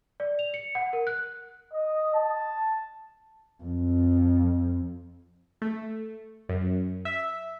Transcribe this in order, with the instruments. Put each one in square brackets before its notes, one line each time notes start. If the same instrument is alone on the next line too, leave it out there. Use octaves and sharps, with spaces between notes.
[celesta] D5
F7
C#7
F#5
A#4
F#6
[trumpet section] D#5
A5
[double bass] F2
[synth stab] A3
F#2
E5